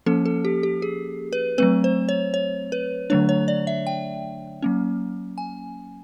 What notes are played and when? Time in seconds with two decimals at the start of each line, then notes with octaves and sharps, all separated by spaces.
0.06 F3 A#3 C#4 A4
0.25 A4
0.45 G4
0.63 G4
0.82 G#4
1.33 B4
1.58 F#3 A3 C4 B4
1.84 C5
2.09 C#5
2.34 C#5
2.72 B4
3.10 D3 F#3 A3 D4 C#5
3.29 C#5
3.48 D5
3.67 E5
3.87 G5
4.62 F#3 A#3 C#4
5.38 G#5